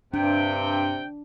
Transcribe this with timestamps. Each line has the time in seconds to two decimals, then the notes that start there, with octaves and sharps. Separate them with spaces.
0.14 G2 C3 D4 G5